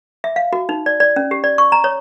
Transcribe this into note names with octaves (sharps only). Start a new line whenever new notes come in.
E5
F5
F#4
D#4
D5
D5
C#4
G4
D5
C#6
A#5
C#5